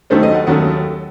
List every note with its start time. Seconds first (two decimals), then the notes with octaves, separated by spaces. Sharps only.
0.10 D#2 D#3 F#3 A3 C#4 C5
0.23 D#5
0.34 F#5
0.47 D#2 D#3 F#3 A3 C#4 F#5